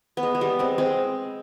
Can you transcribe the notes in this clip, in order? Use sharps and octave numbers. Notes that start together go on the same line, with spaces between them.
B3
G#3
G#3
G3 B3
G#3 C4
G#3 C4